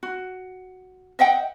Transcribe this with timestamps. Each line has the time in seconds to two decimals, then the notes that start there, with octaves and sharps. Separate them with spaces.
0.03 F#4
1.19 D#5 E5 F#5 G5